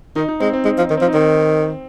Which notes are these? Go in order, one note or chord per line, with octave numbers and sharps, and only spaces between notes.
D#3 D#4
D#4
G#3 C4
C4
G#3 D#4
F3
D#4
D#3
F3 C4
D#4
D#3 C4